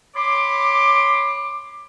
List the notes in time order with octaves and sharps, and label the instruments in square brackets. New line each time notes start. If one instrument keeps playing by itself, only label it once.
[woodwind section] C#5 B5 C6 D6